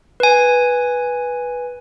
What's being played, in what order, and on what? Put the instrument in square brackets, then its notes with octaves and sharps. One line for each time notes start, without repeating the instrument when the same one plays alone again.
[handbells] B4 G#5